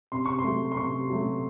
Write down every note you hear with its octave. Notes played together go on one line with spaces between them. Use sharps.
C3 C6
C#6
C6
F#3 A3
C6
C3 C#6
F#3 A3